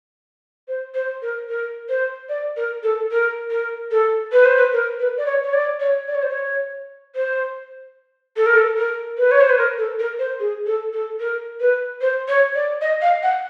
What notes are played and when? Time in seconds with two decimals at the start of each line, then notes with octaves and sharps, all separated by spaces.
0.68 C5
0.95 C5
1.22 A#4
1.49 A#4
1.89 C5
2.29 D5
2.57 A#4
2.83 A4
3.11 A#4
3.51 A#4
3.91 A4
4.32 B4
4.45 C5
4.57 B4
4.73 A#4
4.99 B4
5.17 D5
5.26 C#5
5.43 C#5
5.54 D5
5.80 C#5
6.08 D5
6.15 C#5
6.22 C5
6.29 C#5
7.16 C5
8.37 A4
8.46 A#4
8.57 A4
8.77 A#4
9.18 B4
9.31 C#5
9.41 C5
9.50 B4
9.58 A#4
9.78 A4
9.99 A#4
10.19 C5
10.40 G#4
10.66 A4
10.93 A4
11.20 A#4
11.60 B4
12.01 C5
12.28 C#5
12.55 D5
12.81 D#5
13.02 F5
13.23 F#5